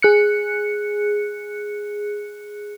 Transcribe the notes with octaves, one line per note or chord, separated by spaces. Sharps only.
G#4 F#6 C#7